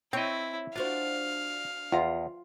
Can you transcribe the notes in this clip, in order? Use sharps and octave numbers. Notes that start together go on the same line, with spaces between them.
C4 E4 C#5 D#5 G5
D4 F4 F#4 C5 F5
E2 F4 A#5